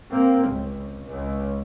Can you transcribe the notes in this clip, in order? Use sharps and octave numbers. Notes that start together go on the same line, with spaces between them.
A#3 C4
C#2
C#2